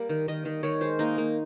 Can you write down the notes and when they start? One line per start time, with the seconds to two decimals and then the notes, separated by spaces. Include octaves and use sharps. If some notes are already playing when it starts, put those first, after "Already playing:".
Already playing: G3 A#3
0.09 D#3
0.28 D#3 D#5
0.45 D#3
0.63 D#3 C#5
0.81 G#3 C5
0.99 A#3 D#4
1.18 A#3